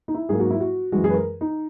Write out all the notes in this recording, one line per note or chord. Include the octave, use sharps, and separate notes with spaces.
D#4
E4
G#2 F#3 A#3 G#4
F#4
E4
F#4
F#2 E3 G#3 F#4
G#4
B4
A#4
D#4